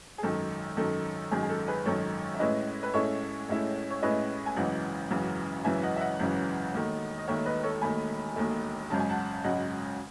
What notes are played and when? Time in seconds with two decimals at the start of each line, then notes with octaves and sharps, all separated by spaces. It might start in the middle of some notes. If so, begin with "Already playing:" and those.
0.18 G#4
0.23 G#1 F#2 D#3 A4
0.77 G#1 F#2 D#3 A4
1.31 G#1 F#2 D#3 G#4
1.43 G#4
1.49 A4
1.68 G#4 B4
1.85 G#1 F#2 D#3 A4 C#5
2.34 E5
2.39 A1 A2 G#3 C#4 E4 B4 D#5
2.83 B4
2.94 A1 A2 G#3 C#4 E4 A4 C#5
3.48 A1 A2 G#3 C#4 E4
3.90 C#5
4.02 A1 A2 G#3 C#4 E4 B4 D#5
4.46 G#5
4.56 G#1 F#2 C#3 E3 D#5 F#5
5.11 G#1 F#2 C#3 E3
5.64 G#1 F#2 C#3 E3 E5 G#5
5.83 D#5 F#5
5.96 E5
6.01 D#5 F#5
6.19 G#1 F#2 C#3 E3
6.73 E1 D#2 D#3 A3
7.18 D#5
7.27 E1 D#2 D#3 A3 C#5 E5
7.45 B4 D#5
7.63 A4 C#5
7.82 E1 D#2 D#3 A3 G#5 B5
8.36 E1 D#2 D#3 A3
8.90 G#1 F#2 C#3 G#3 A5
9.00 G#5
9.10 F#5 A5
9.44 G#1 F#2 C#3 G#3 D#5 F#5